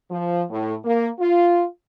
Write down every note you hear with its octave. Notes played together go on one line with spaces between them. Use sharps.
F3
A2
A#3
F4